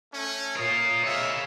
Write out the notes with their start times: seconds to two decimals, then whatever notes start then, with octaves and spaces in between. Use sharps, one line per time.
0.12 A3 C#4
0.56 F4 A#4 C#5 D#6
1.04 G#3 A#3 C#5 E5 F5